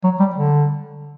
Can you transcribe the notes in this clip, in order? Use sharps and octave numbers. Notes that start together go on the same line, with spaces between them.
F#3
G3
D3